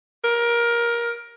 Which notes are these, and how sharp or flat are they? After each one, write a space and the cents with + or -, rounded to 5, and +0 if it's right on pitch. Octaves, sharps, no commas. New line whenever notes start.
A#4 +20